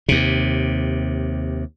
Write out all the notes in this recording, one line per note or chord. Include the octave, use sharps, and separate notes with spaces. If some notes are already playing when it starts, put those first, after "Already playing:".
D#2 C3